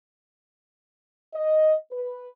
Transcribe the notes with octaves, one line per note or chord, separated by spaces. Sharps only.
D#5
B4